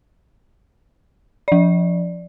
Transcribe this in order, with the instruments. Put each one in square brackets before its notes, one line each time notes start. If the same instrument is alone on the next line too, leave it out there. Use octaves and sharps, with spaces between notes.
[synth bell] F3 D5